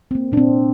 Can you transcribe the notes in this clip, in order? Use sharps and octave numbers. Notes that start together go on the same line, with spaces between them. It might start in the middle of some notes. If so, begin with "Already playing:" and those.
C4
A#3
A#2 D4
C4
A#2